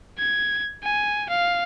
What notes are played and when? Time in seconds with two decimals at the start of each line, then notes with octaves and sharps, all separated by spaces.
0.19 G#6
0.84 G#5
1.29 F5